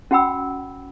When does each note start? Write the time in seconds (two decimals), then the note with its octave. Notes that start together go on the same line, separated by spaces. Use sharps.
0.11 C#4 F#4 F#5 G5 B5 E6